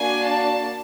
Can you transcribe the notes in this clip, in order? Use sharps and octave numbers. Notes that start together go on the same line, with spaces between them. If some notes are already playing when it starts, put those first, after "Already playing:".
Already playing: A#3 D4 F#4 G#5
A5